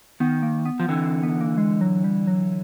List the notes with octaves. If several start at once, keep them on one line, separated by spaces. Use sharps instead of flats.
D#3 B3
A#3
B3
F3
D3 E3 C4
C4
B3
A#3
G#3
F#3
G3
F#3